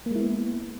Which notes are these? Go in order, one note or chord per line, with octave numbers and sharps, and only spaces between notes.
G#3 A#3 B3 E4